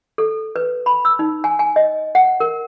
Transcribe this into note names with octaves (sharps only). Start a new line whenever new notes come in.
A4
B4
B5
E6
D#4
G#5
G#5
D#5
F#5
A#4